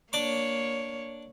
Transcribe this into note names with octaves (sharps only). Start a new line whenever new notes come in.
A#3 D4 C#5 D6